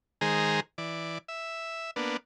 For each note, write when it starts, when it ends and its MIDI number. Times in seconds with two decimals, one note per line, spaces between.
0.21 0.60 51
0.21 0.60 56
0.21 0.60 68
0.21 0.60 72
0.21 0.60 82
0.78 1.18 52
0.78 1.18 74
1.28 1.91 76
1.96 2.17 58
1.96 2.17 59
1.96 2.17 62